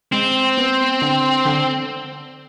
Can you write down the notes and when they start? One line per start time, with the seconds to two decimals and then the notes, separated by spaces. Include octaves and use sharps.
0.12 G#3 C4
0.57 B3
1.02 D3
1.45 D3